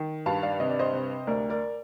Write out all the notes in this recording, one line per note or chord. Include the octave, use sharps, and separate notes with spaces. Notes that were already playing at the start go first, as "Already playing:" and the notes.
Already playing: D#3
G2 F5 A5
D5 F5
C3 D#5
D5
C5 D#5
C3
D2 A#4 D5
A#4 D5